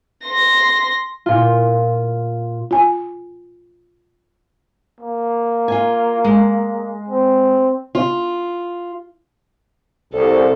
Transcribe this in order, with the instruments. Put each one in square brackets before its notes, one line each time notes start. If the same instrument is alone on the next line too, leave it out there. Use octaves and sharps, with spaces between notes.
[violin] C6 A#6
[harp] A#2 F4
[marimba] F4 G#5
[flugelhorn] A#3
[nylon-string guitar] F4 G#5
G#3
[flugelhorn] C4
[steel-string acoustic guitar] F4
[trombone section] C2 [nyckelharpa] A4